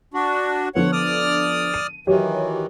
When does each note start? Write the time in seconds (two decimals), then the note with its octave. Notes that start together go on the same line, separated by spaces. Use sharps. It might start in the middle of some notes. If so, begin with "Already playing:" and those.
0.14 D4 F#4
0.75 D3 F3 B3 C#5 F#5
0.92 D5 D#6 F6
1.74 D#7
2.07 D#3 E3 F#3 G4 C#5